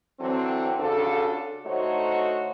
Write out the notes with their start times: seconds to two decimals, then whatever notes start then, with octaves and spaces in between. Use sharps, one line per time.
0.20 D3 E3 F#3 C4
0.80 C#3 D4 F4 F#4 A4
1.67 D3 A3 D#4 F#4 C5 C#5